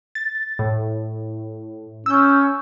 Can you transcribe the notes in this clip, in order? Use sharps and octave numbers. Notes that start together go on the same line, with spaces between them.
A6
A2
C#4 E6 G6